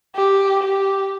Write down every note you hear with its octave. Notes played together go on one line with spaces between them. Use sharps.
G4
G4